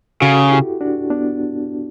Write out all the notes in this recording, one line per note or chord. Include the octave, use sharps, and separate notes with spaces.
C#3 F#4 A4
E4 G4
D4 F#4
B3 D4